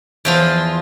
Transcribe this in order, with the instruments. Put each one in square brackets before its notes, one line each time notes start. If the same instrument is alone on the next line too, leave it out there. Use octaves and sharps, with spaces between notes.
[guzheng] E2 F3 F4